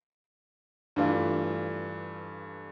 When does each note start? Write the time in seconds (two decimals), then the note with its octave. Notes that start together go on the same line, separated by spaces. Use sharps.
0.96 G2 E3 A3 D4 F4